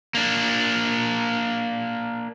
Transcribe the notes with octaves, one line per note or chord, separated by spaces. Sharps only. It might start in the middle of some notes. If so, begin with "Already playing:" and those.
A#3 D4